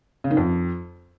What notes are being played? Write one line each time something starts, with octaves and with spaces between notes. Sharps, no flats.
C#3
D#3
F2